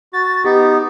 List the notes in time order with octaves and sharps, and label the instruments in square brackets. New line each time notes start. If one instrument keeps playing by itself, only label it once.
[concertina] F#4 [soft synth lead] A6
[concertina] B3 D#4 [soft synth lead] G4